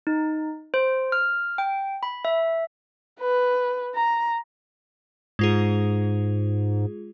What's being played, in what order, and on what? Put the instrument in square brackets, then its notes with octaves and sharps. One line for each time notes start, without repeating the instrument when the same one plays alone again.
[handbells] D#4
C5
F6
G5
B5
E5
[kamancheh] B4
A#5
[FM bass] G#2 [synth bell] G#3 F4 G#4